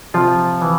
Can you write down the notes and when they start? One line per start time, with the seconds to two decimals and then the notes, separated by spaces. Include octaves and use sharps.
0.14 C3 F3 F4
0.61 E3